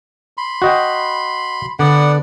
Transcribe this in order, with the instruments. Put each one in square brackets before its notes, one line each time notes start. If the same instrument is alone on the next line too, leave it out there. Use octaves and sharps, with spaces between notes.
[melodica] B5 C6
[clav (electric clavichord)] F#4 D#5 G5
[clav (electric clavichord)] D3 [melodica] B3 D5 F#5